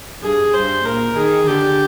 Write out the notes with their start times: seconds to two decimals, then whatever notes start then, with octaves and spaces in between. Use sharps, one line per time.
0.22 G2 G#4
0.53 G2 C5
0.84 A#2 A#4
1.16 D#3 G#4
1.47 D3 G4